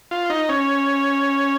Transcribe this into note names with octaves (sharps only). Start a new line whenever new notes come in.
F4
D#4
C#4